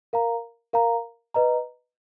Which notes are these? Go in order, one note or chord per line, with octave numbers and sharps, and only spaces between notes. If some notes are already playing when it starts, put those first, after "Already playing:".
A#4 F5 A#5
A#4 F5 A#5
B4 D#5 A#5